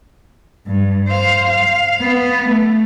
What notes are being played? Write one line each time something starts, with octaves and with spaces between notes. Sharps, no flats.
G2
C5 F5
F5
B3
A3